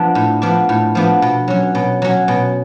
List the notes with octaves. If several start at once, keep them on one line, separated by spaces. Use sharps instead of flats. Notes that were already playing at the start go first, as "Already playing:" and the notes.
Already playing: F3 B3 D4
A2
F3 B3 D4
A2
F3 B3 D4
B2
F#3 C#4
B2
F#3 C#4
B2